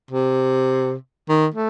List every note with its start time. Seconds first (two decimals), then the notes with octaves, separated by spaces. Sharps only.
0.11 C3
1.29 D#3
1.54 A3